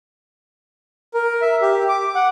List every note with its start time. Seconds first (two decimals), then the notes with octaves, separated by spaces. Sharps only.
1.14 A#4
1.42 E5
1.62 G4
1.89 D6
2.15 F#5